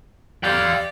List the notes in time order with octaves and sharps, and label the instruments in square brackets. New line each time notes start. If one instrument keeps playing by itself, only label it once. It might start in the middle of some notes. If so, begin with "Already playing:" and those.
[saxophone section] G4 D5 [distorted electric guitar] F5 G5